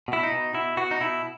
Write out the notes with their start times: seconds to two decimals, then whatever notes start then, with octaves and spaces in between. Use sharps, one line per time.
0.08 B2 E4
0.23 D#4
0.32 B2
0.54 B2 E4
0.77 B2 F#4
0.91 D#4
1.01 B2 E4